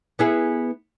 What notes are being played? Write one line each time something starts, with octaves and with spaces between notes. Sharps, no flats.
B3 E4 G#4